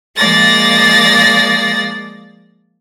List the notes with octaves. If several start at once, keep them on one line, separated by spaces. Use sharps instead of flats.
F3 G#3 A#3 D5 A6 A#6